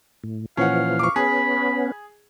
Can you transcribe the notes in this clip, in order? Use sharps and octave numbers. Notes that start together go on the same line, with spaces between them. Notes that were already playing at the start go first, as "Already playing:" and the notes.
A2
A#2 E3 F3 C#4 F5 F#5
C#6 D6
B3 C#4 G#4 B5